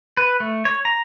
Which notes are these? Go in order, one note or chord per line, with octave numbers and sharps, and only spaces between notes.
B4
A3
C#5
A#5